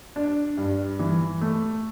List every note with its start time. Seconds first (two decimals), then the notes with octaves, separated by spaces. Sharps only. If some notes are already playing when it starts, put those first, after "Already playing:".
0.16 D4
0.57 G2
0.99 E3
1.41 A3